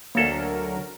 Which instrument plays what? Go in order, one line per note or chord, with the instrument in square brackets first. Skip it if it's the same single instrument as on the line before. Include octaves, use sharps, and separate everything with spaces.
[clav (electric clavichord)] D2 A4 C#5 [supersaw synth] D3 F#3 A#4 [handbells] A#3 F5